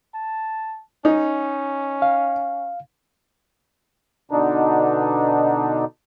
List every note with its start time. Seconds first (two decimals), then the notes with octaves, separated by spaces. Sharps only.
0.14 A5
1.05 C#4 D#4
2.02 F5
4.31 B2 D3 D4 D#4